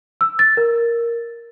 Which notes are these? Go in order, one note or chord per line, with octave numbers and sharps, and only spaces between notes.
E6
A6
A#4